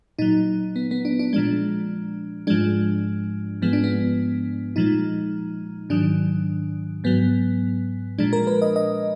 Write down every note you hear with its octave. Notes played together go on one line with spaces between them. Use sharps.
A#2 F#3 D#4
B3
B3
D4
D4
A#2 F3 G#3 D4
G#2 F3 G#3 D4
G#2 F3 G#3 B3
D4
B3
A#2 F3 G#3 D#4
G#2 D#3 F#3 D4
G#2 F#3 B3
A#2 F3 G#3 D4
A#4
B4
D#5
D#5